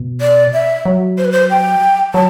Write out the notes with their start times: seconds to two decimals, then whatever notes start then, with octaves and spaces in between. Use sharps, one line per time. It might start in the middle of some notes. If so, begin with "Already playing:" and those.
Already playing: B2
0.21 D5
0.53 E5
0.85 F#3
1.18 C5
1.25 B4
1.32 C5
1.50 G5
2.14 F#3 A5